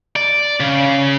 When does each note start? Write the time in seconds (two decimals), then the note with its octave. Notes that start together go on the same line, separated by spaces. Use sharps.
0.16 D5
0.60 C#3